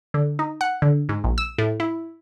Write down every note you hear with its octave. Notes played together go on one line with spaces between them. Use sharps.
D3
D#4
F#5
D3
G#2
A#1
E6
A2
E4